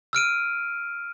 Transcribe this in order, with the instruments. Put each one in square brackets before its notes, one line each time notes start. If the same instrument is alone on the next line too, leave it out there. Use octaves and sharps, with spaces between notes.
[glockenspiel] E6 F6 D7 D#7